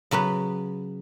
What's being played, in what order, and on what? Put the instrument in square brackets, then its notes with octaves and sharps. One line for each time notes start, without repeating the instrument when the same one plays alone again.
[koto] C#3 F#3 B3 B4